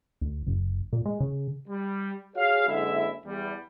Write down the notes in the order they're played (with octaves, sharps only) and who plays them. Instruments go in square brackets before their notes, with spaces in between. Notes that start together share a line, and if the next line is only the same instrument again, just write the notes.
[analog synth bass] D2
F#1
A#2
G#3
C#3
[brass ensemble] G3
F#4 G#4 C#5 F5
F#1 D3 G#3 E4 E5
E2 G3